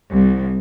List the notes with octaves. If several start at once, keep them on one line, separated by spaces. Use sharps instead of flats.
C2